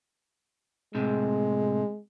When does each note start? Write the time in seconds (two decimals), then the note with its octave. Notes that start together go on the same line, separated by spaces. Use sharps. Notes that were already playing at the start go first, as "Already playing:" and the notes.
0.95 A2 C3 G#3